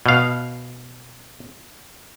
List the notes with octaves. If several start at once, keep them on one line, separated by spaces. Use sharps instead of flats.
B2 F5